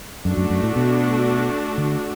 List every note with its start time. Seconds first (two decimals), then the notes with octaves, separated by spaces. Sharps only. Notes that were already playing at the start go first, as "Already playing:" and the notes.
0.25 F#2 A3 D4 F#4
0.37 F#2
0.50 F#2
0.63 A2
0.76 B2
1.78 D3